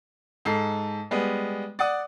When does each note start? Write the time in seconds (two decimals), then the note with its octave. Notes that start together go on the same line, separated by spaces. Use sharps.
0.45 G#2 A4 C7
1.11 G3 G#3 B3
1.79 D5 F#5 D#6